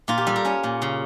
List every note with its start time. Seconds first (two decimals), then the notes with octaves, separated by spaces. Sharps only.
0.08 A#2 F4
0.18 G4
0.27 G3 A4
0.36 A#4
0.45 C#4 C#5
0.64 A#2
0.82 C#3